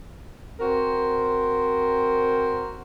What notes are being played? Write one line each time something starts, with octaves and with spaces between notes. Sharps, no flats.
C4 F#4 A#4 C5